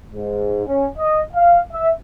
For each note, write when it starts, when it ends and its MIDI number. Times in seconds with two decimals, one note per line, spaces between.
0.13 0.63 44
0.67 0.87 61
0.98 1.21 75
1.33 1.61 77
1.72 1.90 76